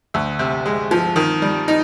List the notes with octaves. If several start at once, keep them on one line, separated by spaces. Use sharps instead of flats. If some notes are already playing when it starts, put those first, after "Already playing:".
D2
C3
G#3
F3
D#3
G3
D#4